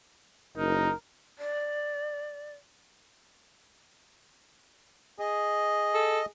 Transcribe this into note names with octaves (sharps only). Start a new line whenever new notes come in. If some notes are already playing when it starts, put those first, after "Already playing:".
F#1 D#4 A#4
D5
G#4 D#5
A4